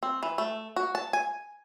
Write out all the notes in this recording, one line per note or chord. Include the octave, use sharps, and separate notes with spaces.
C4
E3
A3
F#4
A5
G#5